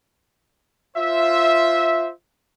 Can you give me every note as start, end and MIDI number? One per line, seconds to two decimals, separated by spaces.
0.96 2.09 65
0.96 2.09 72
0.96 2.09 76